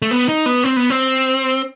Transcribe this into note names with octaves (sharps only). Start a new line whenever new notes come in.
A3
B3
D#4
B3
C4
B3
C4